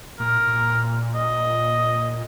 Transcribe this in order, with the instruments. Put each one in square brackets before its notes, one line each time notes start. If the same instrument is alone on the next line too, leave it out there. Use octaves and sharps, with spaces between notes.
[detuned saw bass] A#2 [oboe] A#4
[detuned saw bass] A#2
[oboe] D#5